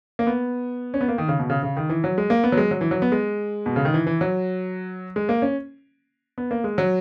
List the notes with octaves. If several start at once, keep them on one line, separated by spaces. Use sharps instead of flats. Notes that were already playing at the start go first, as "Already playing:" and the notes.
A#3
B3
C#4
B3
A#3
D#3
C#3
B2
C#3
C#3
D#3
E3
F#3
G#3
A#3
B3
F#3
G#3
F#3
E3
F#3
B3
G#3
B2
C#3
D#3
E3
E3
F#3
G#3
A#3
C#4
B3
A#3
G#3
F#3